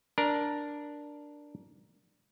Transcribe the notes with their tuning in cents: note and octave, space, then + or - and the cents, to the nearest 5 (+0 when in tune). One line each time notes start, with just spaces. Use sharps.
D4 +0 A#4 +10